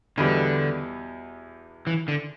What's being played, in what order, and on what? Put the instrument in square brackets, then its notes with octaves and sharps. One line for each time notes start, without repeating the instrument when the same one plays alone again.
[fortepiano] E2 B2 G3 B3 [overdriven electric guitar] D3
[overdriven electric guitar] E3
D3